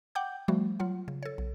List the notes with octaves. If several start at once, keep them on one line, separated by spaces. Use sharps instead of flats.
F#5 G5 D6 G6
F3 G3 A3 F#4
F#3 F4 F#5
C#3
A4 C#5
B1